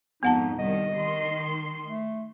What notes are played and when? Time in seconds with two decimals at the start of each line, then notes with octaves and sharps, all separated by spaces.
0.23 F2 G#2 B3 D#4 F#5 A5
0.58 C2 D#3 D#5
0.95 D#3 C6
1.86 A3